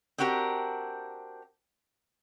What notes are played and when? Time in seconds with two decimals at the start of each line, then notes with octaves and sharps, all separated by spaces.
0.18 C4 D4 F#4 G4 A#4